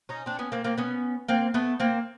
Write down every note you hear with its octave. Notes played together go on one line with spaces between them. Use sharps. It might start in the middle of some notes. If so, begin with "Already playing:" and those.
C#4 D#4
C4 D4
B3 C#4
A#3 C4
A#3 C4
B3 C#4
A#3 C4
A3 B3
A#3 C4